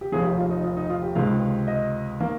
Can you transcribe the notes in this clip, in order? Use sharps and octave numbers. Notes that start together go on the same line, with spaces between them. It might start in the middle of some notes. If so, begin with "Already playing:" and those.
G4
F1 D#2 D#3 G#4
G4
F4
D#4
F4
D#4
F4
G4
C#2 C3 D#3 G#3 F5
D#5
D#3 A#3